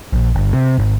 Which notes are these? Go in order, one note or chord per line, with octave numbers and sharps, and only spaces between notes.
A#1
G1
C3
G#1